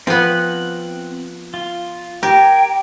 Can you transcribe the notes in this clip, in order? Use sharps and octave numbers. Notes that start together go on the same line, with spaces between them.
F3 B3 C4 F#5
F4
G4 A#4 G5 G#5 A#5